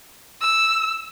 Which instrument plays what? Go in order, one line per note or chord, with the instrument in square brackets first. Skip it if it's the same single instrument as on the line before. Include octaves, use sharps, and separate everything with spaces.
[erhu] E6